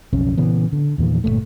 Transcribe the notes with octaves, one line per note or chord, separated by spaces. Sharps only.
B1 F2 C#3 C#4
A#2 C#3 E3 B3
D3
E2 A#2 D#3 F3
G1 F#2 A#2 A3